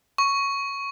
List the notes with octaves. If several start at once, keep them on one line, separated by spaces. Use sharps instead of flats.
C#6